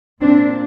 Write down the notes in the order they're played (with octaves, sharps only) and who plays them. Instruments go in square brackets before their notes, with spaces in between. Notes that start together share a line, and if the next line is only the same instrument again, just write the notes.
[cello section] A#2 C4 D4